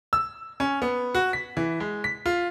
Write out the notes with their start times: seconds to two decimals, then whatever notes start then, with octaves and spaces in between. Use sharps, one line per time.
0.13 E6
0.60 C#4
0.82 B3
1.15 F#4
1.33 B6
1.57 E3
1.80 G#3
2.04 B6
2.26 F4